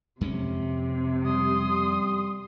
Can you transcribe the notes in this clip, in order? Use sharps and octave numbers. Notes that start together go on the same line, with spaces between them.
F2 C3 G#3 C#4
G3 C6 D#6